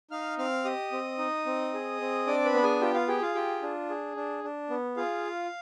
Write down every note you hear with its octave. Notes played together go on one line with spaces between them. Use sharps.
D#4 F5 F6
C4 F5 F6
G4 D#5 D#6
C4
D#4
C4
G#4
C4
D4 D5 D6
B4 B5
B3
G#4 G#5
F4 G4 G5
F4 F5
G4 G#4 G5
F4 F5
F4 G4 G5
D4
G#4
D4
D4
B3
F4 G#4 F5